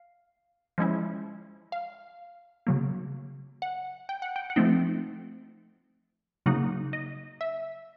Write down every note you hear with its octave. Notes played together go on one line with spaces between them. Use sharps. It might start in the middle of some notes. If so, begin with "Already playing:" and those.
Already playing: F5
F3 G#3 C#4 E4
F5
C#3 F#3 A#3
F#5
G5
F#5
G5
F#5
F3 A3 C4 D#4 G5
C#3 F#3 A#3 D#4 F#5
D#5
E5